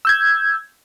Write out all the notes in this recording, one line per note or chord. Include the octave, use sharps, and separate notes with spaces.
E6 G6 G#6